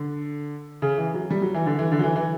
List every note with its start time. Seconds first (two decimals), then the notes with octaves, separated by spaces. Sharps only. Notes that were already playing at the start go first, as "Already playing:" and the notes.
Already playing: D3
0.82 C#3
0.98 E3
1.14 F#3
1.31 G3
1.42 F#3
1.54 E3
1.66 D3
1.79 E3
1.92 D3
1.99 F#3
2.04 E3
2.16 E3